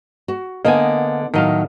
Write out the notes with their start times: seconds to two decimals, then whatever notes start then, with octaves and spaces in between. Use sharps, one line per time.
0.28 F#4
0.65 D3 A#3 B3 D#5 G#5
1.34 A2 D#3 F#3 D#5 F5